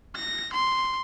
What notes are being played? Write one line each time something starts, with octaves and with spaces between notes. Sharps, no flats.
A#6
C6